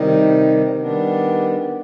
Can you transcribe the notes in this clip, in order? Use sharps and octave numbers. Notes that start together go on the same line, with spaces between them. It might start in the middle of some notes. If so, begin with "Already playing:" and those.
Already playing: C3 D#3 G3 D#4
D#3 G3 B3 D4